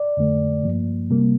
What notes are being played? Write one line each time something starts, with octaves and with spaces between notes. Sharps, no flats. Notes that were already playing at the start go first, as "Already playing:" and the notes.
Already playing: D5
F2 D3 A3
G2 F3 A#3
C3 G3 A#3